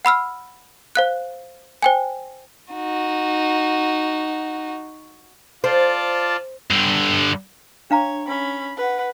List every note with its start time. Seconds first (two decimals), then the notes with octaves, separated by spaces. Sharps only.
0.05 F#5 B5 E6 F6
0.95 C5 F5 F#6
1.83 C5 G5 G#5
2.73 D#4 F#4
5.64 F4 C5 D5 A5
6.70 G2 D3
7.91 D4 C#5 F5 A#5
8.28 C#4 B5
8.77 B4 F#5